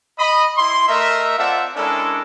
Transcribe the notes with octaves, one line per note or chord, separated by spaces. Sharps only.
D#5 B5 D#6
E4 C6
A3 A#4 D#5 E5
C4 F4 D5 E5 F#5 A5
G#3 C#4 D4 E4 A4 A#4